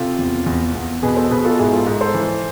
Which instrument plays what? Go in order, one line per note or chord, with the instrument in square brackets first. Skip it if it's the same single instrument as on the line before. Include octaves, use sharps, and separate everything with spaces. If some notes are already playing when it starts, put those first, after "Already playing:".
Already playing: [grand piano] C3 F4 A4
E2
E2
E2
B2 G#4 B4
A4 C5
B2 G#4 B4
F4 A4
G#2 E4 G#4
F4 A4
G#2
A4 C5
E3